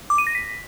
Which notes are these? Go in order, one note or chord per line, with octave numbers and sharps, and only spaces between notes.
D6
D#7
A#6
B6